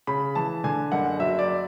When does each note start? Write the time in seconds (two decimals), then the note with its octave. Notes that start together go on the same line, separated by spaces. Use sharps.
0.07 C#3 B5
0.35 E3 A5
0.64 D3 G#5
0.92 F#1 F#5
1.20 F#3 E5
1.39 D5